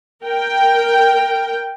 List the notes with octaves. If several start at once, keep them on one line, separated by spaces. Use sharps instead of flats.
A#4 G5